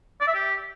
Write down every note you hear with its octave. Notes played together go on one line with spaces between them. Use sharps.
D5
E5
G4